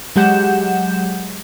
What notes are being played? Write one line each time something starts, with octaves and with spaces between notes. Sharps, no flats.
F#3 G#3 G4 F#5 G6 E7